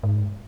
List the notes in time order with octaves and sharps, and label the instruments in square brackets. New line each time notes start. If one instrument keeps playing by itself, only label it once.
[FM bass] G#2